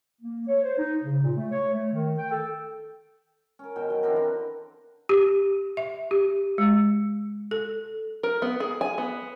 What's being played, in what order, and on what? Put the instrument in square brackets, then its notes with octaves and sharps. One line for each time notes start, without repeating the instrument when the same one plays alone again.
[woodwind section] A#3
C#5
C5
D#4
C#3
A#2
A3
C#5
A3
D#3
G5
A4
[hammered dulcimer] C#4 A#4
B2 D#3 G5
F#3
E3 C4 D4 A#4
D3
[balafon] G4
E5
G4
G#3
A4
[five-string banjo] A#4
B3
G#4
G#5
B3